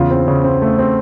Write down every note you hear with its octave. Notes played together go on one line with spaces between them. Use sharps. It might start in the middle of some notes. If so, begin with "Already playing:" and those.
Already playing: E2 C#3 F4
C4
C#3
C4
A3
C4